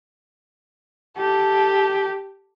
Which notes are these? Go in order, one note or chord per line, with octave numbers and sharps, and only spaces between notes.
G4 A4